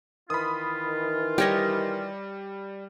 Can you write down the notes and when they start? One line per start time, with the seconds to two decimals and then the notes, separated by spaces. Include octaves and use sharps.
0.30 D#3 E3 F4 B5 D#6
1.38 G3 G4 C#5 D#5 A#6